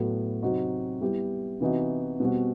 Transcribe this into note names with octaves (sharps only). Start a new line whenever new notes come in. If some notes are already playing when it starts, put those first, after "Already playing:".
Already playing: A2 F#3 B3 F#4 A4
C3 F#3 C4 D#4 F#4
G3 B3 E4 G4
C3 E3 B3 D#4 F#4
B2 G3 C4 F#4